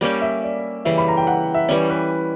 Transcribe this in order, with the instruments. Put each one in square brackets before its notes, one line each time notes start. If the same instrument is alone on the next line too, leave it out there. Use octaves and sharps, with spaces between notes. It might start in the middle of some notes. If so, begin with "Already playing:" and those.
[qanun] G3 A#3 C#4 G4 [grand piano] D5
[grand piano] E5
D5
[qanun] C#3 E3 G3 [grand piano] E5
[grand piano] B5
A#5
G5
F#5
E5
[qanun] E3 G3 C#4 [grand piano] D5
[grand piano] B4